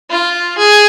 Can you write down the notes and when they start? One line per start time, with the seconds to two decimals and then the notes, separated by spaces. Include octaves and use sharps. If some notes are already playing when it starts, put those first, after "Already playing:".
0.11 F4
0.58 G#4